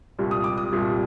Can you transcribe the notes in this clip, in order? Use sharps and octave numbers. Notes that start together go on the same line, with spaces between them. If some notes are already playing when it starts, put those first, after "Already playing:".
C2 A#2 G3
D#6
D6
D#6
C2 A#2 G3